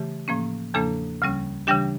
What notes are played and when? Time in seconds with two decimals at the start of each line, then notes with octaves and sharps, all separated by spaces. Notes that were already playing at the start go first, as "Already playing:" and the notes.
Already playing: C#3 E3 A3 G4
0.28 A2 F3 A#3 C#4
0.74 E2 C#3 F3 A#3 D4 A4 A5
1.22 D2 C#3 G3 C#4
1.67 C#3 E3 G3 D4 G4 G5